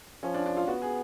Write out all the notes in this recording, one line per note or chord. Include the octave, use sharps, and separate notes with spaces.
F3 C#4
D4
D4
F4
B3 F#4
G#4